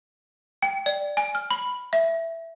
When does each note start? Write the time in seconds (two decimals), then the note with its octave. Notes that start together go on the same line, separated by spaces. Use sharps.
0.63 G5
0.86 D5
1.17 G#5
1.35 F6
1.51 B5
1.93 E5